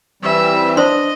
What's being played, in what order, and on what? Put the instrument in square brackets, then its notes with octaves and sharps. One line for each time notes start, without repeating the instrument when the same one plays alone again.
[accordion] E3 G3 C4 [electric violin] E5
[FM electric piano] D4 [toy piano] C5 C6 [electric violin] D#5